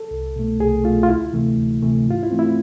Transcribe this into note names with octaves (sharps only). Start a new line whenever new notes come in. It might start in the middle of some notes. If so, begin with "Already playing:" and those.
Already playing: A4
C2
B2 A3
C2 G#4
B2 A3 F4
F4
D2 E4
C3 E3 A3
D2
C3 E3 A3
G#2 F4
E4
E3 A3 C4
E4